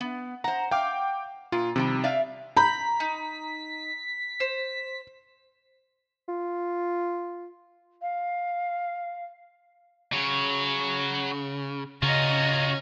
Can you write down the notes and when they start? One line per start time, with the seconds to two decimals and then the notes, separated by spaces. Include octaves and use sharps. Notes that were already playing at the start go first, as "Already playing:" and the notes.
0.01 B3
0.44 C5 F#5 A#5
0.71 F5 G5 D6
1.52 A#2 F4
1.76 C3 D#3 F3 G3
2.04 D5 E5 F5
2.57 A#5 B5 G6 B6
3.00 D#4
4.40 C5
6.28 F4
8.01 F5
10.12 C#3 F#4 C#5
12.03 C#3 C#4 F4 F#4 D#5 A#5